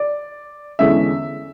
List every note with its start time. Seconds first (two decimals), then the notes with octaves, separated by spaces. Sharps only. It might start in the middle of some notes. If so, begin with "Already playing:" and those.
Already playing: D5
0.79 E2 D3 G#3 C#4 E5